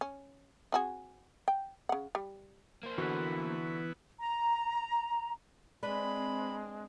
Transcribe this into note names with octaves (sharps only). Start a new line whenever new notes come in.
C#4
C4 F#4 G#4
G5
C#3 F#5
G3
A#3 C5
D3 E3 B3 E4 F#4 B4
A#5
G#3 C4 D4 B4 B5